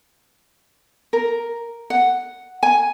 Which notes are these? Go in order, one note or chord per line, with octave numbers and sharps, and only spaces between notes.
A#4
F#5
G#5